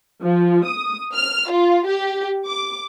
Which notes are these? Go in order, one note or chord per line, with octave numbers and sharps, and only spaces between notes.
F3
D#6
F6
F4
G4
D6